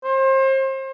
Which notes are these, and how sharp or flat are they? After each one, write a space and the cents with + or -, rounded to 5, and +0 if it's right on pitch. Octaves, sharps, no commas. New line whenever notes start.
C5 +35